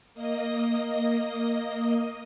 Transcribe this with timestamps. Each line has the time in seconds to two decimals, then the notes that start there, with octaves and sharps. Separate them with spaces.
0.14 A#3 D#5 D#6